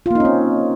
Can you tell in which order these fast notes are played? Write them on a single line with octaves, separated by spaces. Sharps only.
F4 A#3 D#4 C#4 C4